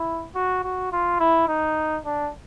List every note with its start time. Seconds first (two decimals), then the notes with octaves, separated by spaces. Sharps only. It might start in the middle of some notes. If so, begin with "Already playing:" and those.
Already playing: E4
0.35 F#4
0.63 F#4
0.92 F4
1.20 E4
1.48 D#4
2.05 D4